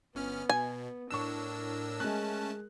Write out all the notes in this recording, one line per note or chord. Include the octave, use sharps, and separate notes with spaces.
G1 B3 C#4 F6
B2 G#5
A2 D4 A#4 C#6 E6 E7
G#3 A3 C#4 A5 F#6